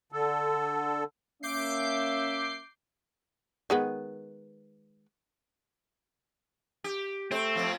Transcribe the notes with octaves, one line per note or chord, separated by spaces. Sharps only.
D3 A4
A#3 C#4 E5 D6 G6 C7
D#3 G#3 B3
G4
A3 C4 C5
F2 F3